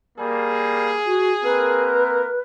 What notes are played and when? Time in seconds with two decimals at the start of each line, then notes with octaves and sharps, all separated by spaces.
0.19 G3 A#3 G#4
1.05 F#4
1.43 A#3 C4 A#4 B4